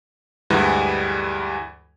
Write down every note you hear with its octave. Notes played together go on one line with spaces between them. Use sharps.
D2 G2 E3 G3 G#3